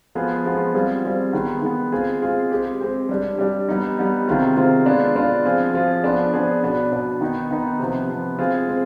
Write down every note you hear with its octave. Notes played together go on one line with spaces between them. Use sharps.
F3 G#3 B3 F4 G#4
F3 G#3 B3 F4 G#4
G3 C4 F4 G#4
G3 C4 F4 G#4
D#3 G#3 B3
D#3 G#3 B3
G#3 C4 F4 G#4
G#3 C4 F4 G#4
G#3 C4 G4
G#3 C4 G4
G3 D4 G4
G3 D4 G4
G3 B3 D#4
G3 B3 D#4
C3 D#3 G#3 C4 F4
C3 D#3 G#3 C4 F4
G#3 B3 D4 F4
G#3 B3 D4 F4
F3 C4 F4 G#4
F3 C4 F4 G#4
F3 B3 D4 G#4
F3 B3 D4 G#4
B2 B3 D4
B2 B3 D4
D#3 B3 D#4
D#3 B3 D#4
C3 F3 B3
C3 F3 B3
G#3 C4 F4 G#4
G#3 C4